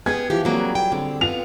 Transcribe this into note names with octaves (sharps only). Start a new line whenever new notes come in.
B3 G4 G#4 G#6
E3 F3 G4 D6
F#3 G3 A#3 C4 G#4
G5
D3 C4
B3 F4 F7